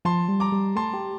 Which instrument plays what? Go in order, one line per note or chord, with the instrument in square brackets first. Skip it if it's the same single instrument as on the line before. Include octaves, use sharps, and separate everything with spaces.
[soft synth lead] F3 [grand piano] A5 C6
[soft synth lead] G3
[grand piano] A#5 D6
[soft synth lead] G3
[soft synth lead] A3 [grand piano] A5 C6
[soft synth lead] G4